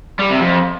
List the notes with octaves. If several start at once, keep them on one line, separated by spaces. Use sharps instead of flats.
G3
C3
F2